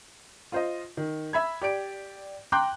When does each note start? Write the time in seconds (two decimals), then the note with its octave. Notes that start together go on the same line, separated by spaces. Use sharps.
0.52 F4 C5 D#5
0.97 D#3
1.33 E5 B5 G#6
1.62 G4 D5 D7
2.52 G5 A#5 C6 D6 F#6 G6